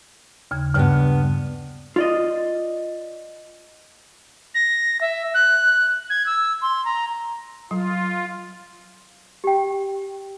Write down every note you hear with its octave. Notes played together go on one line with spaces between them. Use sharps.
D#2 C#3 G#6
G2 C#3 B3
F4 D5 D#5
A#6
E5
F#6
G#6
E6
C6
A#5
F#3 F4
G4 G5